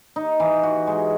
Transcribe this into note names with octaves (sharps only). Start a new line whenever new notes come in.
D#4
E3
F#4
G#3